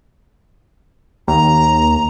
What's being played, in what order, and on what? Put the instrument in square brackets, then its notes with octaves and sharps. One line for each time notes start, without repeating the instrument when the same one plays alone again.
[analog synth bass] D#2 [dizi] A#5